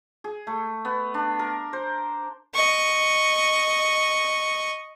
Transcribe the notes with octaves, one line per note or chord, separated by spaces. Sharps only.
G#4
A3
B3
D4
A#4
C5
D#5 C#6